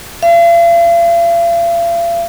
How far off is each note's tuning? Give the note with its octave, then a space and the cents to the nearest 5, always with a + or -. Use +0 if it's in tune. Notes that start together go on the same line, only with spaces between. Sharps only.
F5 -45